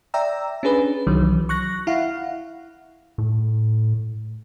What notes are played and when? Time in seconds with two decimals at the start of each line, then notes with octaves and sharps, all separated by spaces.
0.14 D5 E5 G5 A#5 E6
0.63 C#4 D4 G#4 B4
1.07 C2 D#3 E3 F#3
1.49 C#6 F#6 A#6
1.87 E4 F5 F#5
3.18 A2